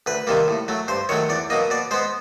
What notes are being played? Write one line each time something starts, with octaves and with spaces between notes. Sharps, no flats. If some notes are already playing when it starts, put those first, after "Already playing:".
D2 B4
C3 D#3 G3 A#3
A2
F#3 A3
G2 C5
D#3 F#3 A3 C#5
E2 D5
B2 F#3 A#3 D#5
B2 D5
G#3 B3 C5